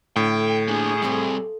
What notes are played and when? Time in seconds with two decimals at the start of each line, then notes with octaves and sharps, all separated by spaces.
0.16 A2 D3 G5
0.68 A#3 D4 G#4
1.02 G3 C4 F4 A4 D#5